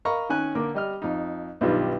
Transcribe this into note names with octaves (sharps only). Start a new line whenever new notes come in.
A#4 D#5 F5 A#5 B5 C#6
D#3 C#4 G#5 F#6
D3 A#3 D6
G3 D#5 F6
F2 D#4
B1 G2 D#3 G3 F4 B4